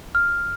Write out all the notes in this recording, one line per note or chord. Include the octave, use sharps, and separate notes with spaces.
F6